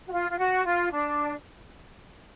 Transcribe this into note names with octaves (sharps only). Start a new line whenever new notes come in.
F#4
F4
F4
F#4
F4
D4